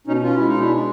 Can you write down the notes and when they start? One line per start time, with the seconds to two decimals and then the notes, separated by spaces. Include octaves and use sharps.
0.07 B2 C#4 D#4
0.23 C#4 F4
0.35 G#3 E4
0.48 D#4
0.54 B2
0.59 D4 E4
0.70 G#3